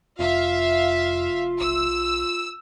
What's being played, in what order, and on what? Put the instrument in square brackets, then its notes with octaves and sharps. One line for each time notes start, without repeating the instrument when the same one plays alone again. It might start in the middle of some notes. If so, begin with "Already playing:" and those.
[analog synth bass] F1 [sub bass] F2 [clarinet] F4 [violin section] E5 F5
[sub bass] B1 [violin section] E6